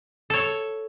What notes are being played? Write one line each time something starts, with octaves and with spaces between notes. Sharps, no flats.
A4 C#5